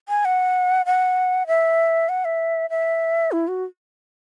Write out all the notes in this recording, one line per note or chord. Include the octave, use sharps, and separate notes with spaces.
G#5
F#5
F#5
E5
F#5
E5
E5
E4
F#4